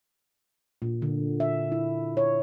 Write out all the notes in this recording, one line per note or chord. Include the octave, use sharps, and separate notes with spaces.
A#2
D3
E5
E4
C#5